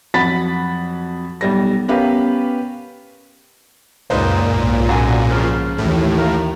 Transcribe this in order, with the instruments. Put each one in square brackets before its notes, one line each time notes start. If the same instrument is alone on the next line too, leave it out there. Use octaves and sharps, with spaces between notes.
[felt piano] F2 F#3 F#5 B5 A6 B6
B1 G3 A#6
B3 C#4 G4 A#4 B4 F5
[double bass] C#2 F#2 [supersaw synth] A#2 [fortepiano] D#4 B4 C5
[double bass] B1 G#2
[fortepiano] F#2 F#4 G#5
C#3 F3
[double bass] D#2 E3 [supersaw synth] A2
[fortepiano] A#4 F5